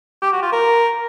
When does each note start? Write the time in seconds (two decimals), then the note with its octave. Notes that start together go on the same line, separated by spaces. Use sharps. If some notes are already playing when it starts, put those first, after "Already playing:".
0.22 G4
0.32 F#4
0.42 F4
0.52 A#4